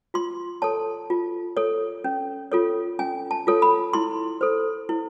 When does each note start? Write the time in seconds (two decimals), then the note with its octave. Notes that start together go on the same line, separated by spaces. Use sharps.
0.14 F4 C6
0.62 A4 C#5 A5
1.10 F4
1.57 A4 C#5
2.04 C#4
2.52 F4 A4 C#5
2.99 C#4 G#5
3.31 A5
3.47 F4 A4 C#5
3.62 B5
3.93 E4 C6
4.41 A4 C5
4.89 E4